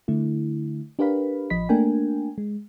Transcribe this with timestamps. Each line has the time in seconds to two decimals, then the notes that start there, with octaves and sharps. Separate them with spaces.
0.08 D3 A3 E4
0.99 D4 G4 A#4 B4 F5 B5
1.50 A1 F3 D#5 B5 B6
1.69 A3 A#3 D4 A#4 G5 G#5
2.38 G#3